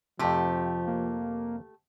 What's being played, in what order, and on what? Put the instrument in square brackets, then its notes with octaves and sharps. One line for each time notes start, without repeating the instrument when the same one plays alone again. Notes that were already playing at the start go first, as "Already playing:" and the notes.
[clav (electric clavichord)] F2 C3 [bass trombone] F3 [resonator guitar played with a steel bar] A3 G4
[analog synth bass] A#3